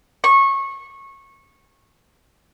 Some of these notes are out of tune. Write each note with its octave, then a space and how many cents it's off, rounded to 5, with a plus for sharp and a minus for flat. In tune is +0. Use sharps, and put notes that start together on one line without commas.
C#6 -20